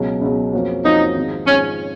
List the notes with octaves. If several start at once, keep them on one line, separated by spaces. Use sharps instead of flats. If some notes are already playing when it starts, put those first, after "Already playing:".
Already playing: C#2 B2 F#3
C#2 B2 F#3
F2 F3 A#3 C#4 F#4
F2 F3 A#3 C#4 D#4 F#4
G#1 G#2 F3
G#1 G#2 F3 C#4